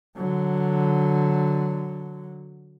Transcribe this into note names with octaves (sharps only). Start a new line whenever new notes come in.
D3 F#3